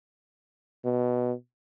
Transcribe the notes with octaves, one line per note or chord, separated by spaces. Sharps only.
B2